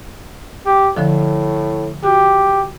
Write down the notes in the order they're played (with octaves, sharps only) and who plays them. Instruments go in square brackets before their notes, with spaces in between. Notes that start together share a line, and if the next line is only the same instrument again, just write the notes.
[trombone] G4
[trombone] A2 [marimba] D3 F3
[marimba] F#4 [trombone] G4